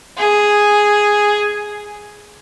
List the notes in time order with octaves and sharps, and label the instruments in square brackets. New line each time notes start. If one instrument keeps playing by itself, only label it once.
[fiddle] G#4